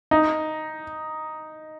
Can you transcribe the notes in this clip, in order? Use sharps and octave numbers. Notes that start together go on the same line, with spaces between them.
D#4